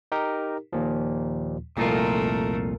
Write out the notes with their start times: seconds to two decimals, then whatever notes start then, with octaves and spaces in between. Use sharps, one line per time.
0.12 D#4 G4 A#4
0.73 D#2 A#2 F3
1.77 C2 F2 A#2 A3 D#4 F4 A#4